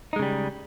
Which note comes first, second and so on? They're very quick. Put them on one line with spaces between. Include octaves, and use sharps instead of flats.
D#4 G#3 C#3 G3